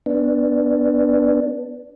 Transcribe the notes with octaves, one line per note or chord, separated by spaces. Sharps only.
B3 D4